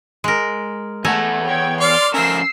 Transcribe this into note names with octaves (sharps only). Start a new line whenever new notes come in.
G#3 A#4
E2 A3 A4 F#5 G#5 A#5
C#5 G5 G#6
D5 C6 F6
F3 A3 C#4 A#4 E6 C7